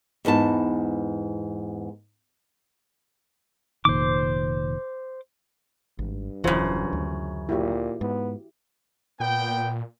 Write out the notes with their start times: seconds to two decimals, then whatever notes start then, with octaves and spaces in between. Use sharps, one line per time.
0.25 E2 G#2 B4 A5
3.85 F1 A#2 D#3 C5 D6
5.99 G#1 G2
6.44 D#1 F#2 C#3 E3 F4 C5
6.93 D2
7.49 A#2 E4 F#4 G4
8.01 G#2 B3
9.20 A#2 B3 G5